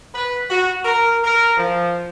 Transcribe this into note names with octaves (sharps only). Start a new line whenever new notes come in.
B4
F#4
A#4
A#4
F3